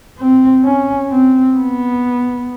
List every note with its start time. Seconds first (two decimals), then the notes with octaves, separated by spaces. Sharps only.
0.18 C4
0.64 C#4
1.09 C4
1.56 B3